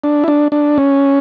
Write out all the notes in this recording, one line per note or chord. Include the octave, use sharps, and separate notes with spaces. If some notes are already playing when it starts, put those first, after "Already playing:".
D4
E4
D4
D4
C#4